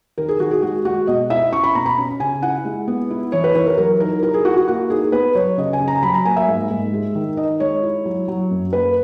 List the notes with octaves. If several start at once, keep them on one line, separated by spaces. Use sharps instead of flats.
D#3 A#4
G#4
D#3 F#4
G#4
G#3 F#4
G#3 F#4
B2 D#5
E4 E5
C#4 C#6
B5
B2 A#5
B5
C#4
C#3 G#5
E4 F#5
G#3
B3
E4
E3 C#5
B4
E3 C#5
A#4
F#3 A#4
D#4 A#4
E4 A#4
G#4
E4 F#4
F#4
A#3 F#4
D#4 G#4
B3 B4
F#3 C#5
C#3 D#5
G#5
C#3
A#5
F#3 B5
A#5
A#3 G#5
E5
G#2
G#2
G#3
D#3
D#4 D#5
G#3 C#5
E4
F#3
F#3
F#2
A#3 B4